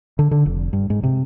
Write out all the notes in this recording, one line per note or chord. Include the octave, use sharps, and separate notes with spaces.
D3
D3
F1
G2
G#2
C3